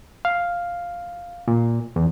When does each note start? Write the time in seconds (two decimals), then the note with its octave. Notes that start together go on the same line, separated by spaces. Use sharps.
0.25 F5
1.48 A#2
1.96 E2